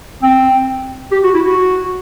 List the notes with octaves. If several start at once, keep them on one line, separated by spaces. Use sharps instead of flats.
C4
G4
F#4
E4
F#4